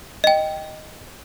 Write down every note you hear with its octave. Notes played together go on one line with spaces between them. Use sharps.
D#5 G5